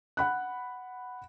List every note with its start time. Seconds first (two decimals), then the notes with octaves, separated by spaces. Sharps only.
0.17 F#5 B5 F#6